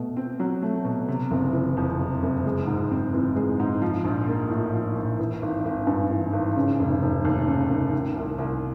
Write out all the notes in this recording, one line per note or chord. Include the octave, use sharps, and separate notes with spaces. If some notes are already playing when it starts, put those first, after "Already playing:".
Already playing: B2 A3
C4
F#3
A3
B2
C3
F#1
E3
F2
C3
F#1
G#3
G#2
C4
E3
G#3
G#2
F3
A#1
A#3
A2
F3
A#1
E3
G#1
G#1
G2
E3
G#1
C#3
F1
F1
D#2
C#3
F1
D#3
C2
C2